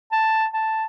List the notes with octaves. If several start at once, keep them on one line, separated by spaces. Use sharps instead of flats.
A5
A5